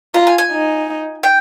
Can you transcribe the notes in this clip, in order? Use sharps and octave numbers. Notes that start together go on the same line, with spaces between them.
F4 A#5
G#5
G#5
D#4
G5